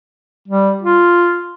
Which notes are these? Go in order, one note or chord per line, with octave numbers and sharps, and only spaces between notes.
G3
F4